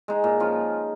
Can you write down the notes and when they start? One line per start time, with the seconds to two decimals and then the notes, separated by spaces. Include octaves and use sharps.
0.08 G#3 D#4 G#4
0.24 A#2
0.40 F3 C#4 F4